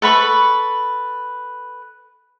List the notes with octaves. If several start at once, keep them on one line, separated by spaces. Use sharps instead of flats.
A4 B4 B5 C#6